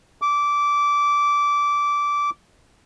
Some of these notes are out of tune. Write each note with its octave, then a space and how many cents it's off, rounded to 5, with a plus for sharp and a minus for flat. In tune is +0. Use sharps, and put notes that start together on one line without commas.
D6 -15